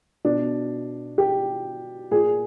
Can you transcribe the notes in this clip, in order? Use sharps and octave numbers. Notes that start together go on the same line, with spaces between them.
B2 D4
G4
A#2 G#4